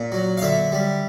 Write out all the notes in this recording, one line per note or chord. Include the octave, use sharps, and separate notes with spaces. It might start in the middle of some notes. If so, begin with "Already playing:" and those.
Already playing: A#2
F#3
F5
D3 E5
G3